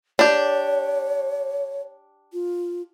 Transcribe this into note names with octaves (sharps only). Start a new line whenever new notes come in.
D4 G4 C#5
F4